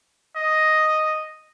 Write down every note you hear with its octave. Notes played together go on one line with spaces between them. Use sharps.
D#5